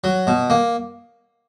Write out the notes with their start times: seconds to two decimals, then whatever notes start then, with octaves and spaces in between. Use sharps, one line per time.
0.04 F#3
0.27 B2
0.50 A#3